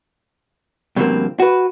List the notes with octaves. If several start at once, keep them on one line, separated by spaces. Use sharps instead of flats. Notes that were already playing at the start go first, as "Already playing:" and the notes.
G2 B2 D3 F3 A#3 C4
F#4 B4